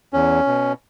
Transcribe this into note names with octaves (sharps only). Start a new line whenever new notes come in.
E2 C#4
B2